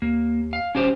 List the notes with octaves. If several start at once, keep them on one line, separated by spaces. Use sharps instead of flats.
D#2 A#3
F5
D#1 C#4 G4 C5